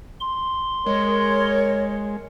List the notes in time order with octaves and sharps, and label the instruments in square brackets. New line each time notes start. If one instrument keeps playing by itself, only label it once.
[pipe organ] C6
[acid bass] G#3 [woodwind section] A#4 C#5